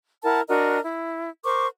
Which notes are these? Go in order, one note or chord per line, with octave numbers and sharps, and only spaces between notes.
E4 A#4 F#5 A5
D4 F#4 A#4 D#5
E4
A#4 C5 C#6 D6